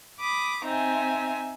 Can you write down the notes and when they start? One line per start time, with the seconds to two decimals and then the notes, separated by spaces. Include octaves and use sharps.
0.20 B5 D6 D#6
0.64 C4 D#4 E5 G#5